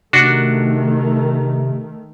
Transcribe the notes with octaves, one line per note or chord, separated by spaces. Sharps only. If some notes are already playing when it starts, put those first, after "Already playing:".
C3 D#3 A3 D4 F#4